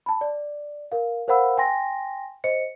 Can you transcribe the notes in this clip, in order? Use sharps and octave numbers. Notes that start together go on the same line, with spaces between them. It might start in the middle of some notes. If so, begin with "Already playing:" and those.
A5 B5
D5
A#4 F5
A#4 C5 F5 F#5 B5 E6
G5 G#5 C6 A#6
C5 D#5 C#7